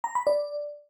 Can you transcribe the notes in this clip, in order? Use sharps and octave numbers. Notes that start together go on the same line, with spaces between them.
A#5
B5
D5